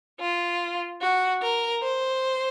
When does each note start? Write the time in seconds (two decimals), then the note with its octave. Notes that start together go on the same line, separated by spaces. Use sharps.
0.20 F4
1.01 F#4
1.42 A#4
1.83 C5